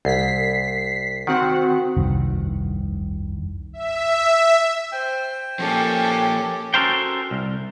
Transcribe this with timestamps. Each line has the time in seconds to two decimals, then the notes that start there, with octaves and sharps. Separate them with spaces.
0.05 C2 B6 C7
1.27 D#3 C4 F#4 F#5
1.97 F1 C2 G2 D#3
3.73 E5
4.92 C5 G5
5.59 F3 A#3 C#4 G4 A4 D6
6.74 C#4 F#4 A4 A#4 C5 G5
7.31 C2